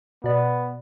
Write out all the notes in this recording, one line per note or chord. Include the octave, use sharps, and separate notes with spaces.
B2 B3 D5